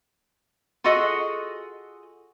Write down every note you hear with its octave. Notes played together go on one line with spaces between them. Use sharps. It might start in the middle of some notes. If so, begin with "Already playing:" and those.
F4 F#4 G#4 A4 D#5